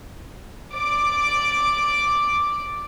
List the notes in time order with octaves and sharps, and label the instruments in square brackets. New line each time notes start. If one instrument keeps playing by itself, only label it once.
[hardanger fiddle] D5 D6